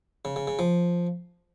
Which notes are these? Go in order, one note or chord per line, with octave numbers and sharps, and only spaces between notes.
C#3
C#3
C#3
F3